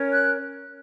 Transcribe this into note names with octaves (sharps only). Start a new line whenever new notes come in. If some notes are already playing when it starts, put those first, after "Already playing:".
Already playing: C#4 A#4 C#5
F#6